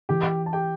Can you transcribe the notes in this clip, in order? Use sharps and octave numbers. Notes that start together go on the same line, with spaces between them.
E3 G4 G5
A5
G4 G5